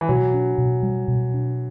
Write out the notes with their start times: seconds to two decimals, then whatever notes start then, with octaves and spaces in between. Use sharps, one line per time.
0.01 E3
0.08 B2 F#3
0.34 D4
0.58 B2
0.83 G3
1.08 B2
1.34 D4